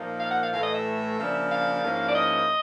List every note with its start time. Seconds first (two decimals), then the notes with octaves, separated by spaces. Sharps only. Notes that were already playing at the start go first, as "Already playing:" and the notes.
Already playing: A#2 F3 A#3 D#4
0.20 F5
0.31 F#5
0.42 F5
0.52 A2 E3 A3 F5
0.64 D#5
0.75 E5
1.18 C#3 F3 A#3 D4
1.50 F5
1.83 G#2 F3 A#3 C#4 E4
2.08 D5
2.15 D#5